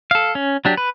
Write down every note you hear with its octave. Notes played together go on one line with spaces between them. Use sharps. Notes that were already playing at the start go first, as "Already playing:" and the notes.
A4 F5
C#4
F#3 D4 G4
B4